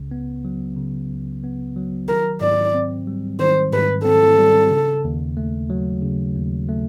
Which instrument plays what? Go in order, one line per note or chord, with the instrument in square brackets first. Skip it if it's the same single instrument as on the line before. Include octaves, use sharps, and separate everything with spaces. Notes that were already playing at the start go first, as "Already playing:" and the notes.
Already playing: [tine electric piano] C#2 C#3
B3
F#3
C#3
C#2
B3
F#3
[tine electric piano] D#3 [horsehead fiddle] A#4
[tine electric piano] G#2 [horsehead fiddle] D5
[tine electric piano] C4
G3
[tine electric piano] D#3 [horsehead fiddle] C5
[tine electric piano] G#2 [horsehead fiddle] B4
[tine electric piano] C4 [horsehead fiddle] A4
[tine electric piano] G3
C#3
D#2
A3
F#3
C#3
D#2
A3